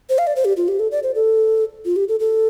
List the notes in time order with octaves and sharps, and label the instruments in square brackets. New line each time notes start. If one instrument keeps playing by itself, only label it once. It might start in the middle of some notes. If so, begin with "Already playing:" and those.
[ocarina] C5
F5
D5
C5
G4
F4
G4
A4
D5
C5
A4
F4
G4
A4
A4